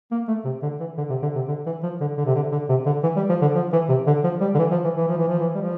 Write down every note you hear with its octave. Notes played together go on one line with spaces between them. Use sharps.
A#3
A3
C3
D3
E3
D3
C3
D3
C3
D3
E3
F3
D3
D3
C3
D3
D3
C3
D3
E3
G3
F3
D3
F3
E3
C3
D3
F3
G3
D3
E3
F3
E3
E3
F3
E3
F3
E3
G3
F3